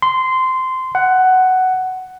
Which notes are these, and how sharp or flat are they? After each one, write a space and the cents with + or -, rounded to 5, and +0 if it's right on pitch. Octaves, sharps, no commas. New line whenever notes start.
C6 -15
F#5 +10